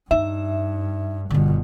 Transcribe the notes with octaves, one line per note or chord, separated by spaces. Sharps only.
G2 D#4 E5
G1 B2 D3 G3